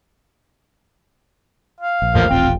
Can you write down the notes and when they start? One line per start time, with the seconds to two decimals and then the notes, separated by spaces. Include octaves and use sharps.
1.81 F5
2.02 A#1
2.15 E2 A2 D3 F3 A#3
2.30 D#1 A1 C4 F4 G5